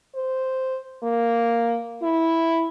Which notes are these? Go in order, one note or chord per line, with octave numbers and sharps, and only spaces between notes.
C5
A#3
E4